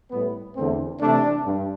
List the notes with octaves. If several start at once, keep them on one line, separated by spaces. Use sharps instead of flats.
A2 G3 B3
E2 D3 A3 C4
C3 E3 A3 D4
G2